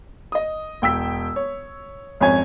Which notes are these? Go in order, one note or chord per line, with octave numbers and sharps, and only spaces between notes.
D#5 D#6
E1 G5 E6 B6
C#5
G#1 F2 C#4 C#5 G#5 G#6